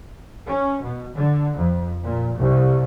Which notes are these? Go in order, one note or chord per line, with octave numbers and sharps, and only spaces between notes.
C#4
B2
D3
F2
A#2
C2